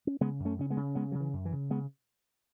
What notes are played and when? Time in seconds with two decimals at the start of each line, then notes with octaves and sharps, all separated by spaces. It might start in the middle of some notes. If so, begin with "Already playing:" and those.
0.07 C#4
0.21 C#3 G#3 B3
0.40 F#2
0.45 A3 C#4
0.59 C#3 C#4
0.70 G#3 B3
0.77 C#3
0.95 C#3 G#3 B3
1.12 C#3 F#3
1.20 E3
1.33 F#2
1.45 E3
1.52 C#3
1.70 C#3 G#3 B3